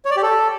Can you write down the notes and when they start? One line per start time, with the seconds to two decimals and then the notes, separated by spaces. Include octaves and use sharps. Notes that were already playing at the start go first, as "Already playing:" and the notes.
0.05 C#5
0.11 D5
0.17 G4
0.23 A4